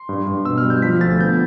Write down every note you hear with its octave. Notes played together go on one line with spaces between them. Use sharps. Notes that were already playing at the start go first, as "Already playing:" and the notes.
Already playing: C6
G2
G2
B2 E6
F6
G3
G6
F3 B6
D2 A6
B3 G6